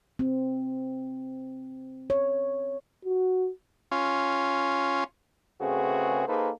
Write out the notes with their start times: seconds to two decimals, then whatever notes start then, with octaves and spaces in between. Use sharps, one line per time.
0.19 C4
2.10 C#5
3.05 F#4
3.92 C#4 F4
5.61 C#3 A3 C4 F#4 G#4 B4
6.28 A#3 D#4 G#4 A4 B4 C5